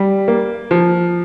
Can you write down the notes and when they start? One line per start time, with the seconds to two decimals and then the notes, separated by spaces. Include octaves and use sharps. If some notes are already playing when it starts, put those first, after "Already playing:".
Already playing: G3
0.28 A#3
0.71 F3